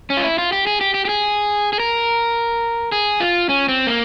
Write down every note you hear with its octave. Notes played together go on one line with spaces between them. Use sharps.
C#4
F4
E4
F4
G4
G#4
G4
G4
G4
G#4
G#4
A#4
G#4
F4
C#4
C4
A#3